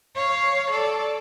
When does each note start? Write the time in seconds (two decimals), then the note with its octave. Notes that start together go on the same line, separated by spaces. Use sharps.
0.15 C#5 F5
0.71 A4 D5